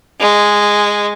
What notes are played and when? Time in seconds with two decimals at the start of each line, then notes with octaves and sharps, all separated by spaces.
0.20 G#3